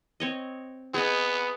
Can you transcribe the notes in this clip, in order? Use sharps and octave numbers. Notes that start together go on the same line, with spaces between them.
C4 C#5 D#5
B3 G#4 D#5